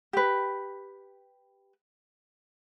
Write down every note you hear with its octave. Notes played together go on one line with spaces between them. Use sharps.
G4 B4